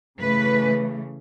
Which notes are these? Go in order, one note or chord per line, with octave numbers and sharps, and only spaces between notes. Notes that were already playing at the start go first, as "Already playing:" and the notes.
C#3 E3 A3 B4